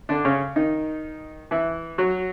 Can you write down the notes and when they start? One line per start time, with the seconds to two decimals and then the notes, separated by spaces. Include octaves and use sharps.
0.09 D3 D4
0.25 C#3 C#4
0.56 D#3 D#4
1.51 E3 E4
1.98 F#3 F#4